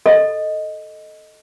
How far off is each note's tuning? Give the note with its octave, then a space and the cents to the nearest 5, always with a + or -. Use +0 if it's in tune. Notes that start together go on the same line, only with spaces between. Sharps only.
A4 +0 D#5 +0